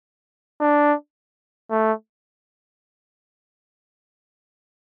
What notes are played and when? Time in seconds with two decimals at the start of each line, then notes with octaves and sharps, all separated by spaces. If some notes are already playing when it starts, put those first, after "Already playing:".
0.61 D4
1.71 A3